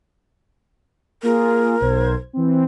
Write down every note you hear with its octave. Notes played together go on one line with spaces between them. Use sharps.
A#3 F4 G#4 A#4
B1 C5 G#6
E3 C4